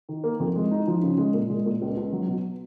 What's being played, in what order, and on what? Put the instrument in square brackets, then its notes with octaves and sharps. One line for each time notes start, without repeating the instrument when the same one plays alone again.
[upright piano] D#3
A#3
F2
G#3
D#4
F3
C#3
G#3
A#2
G#3
A#2
C#2
C#2
F#3
B2